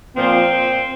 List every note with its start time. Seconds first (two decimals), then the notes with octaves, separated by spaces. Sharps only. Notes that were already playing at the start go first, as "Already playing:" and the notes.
0.15 A#2 F3 C4